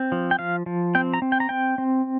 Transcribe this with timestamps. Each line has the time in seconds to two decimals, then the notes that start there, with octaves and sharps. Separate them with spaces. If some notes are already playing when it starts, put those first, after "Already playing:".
Already playing: C4
0.12 F3
0.31 G5
0.39 F3 F5
0.66 F3
0.95 C4 G5
1.14 A#5
1.22 C4
1.32 G5
1.40 A#5
1.49 C4 G5
1.78 C4